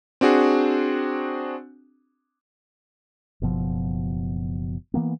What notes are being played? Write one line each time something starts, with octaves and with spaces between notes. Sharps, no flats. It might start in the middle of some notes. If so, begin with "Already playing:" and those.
C4 D4 F#4 G#4
F#1 B2 F3
E3 A#3 B3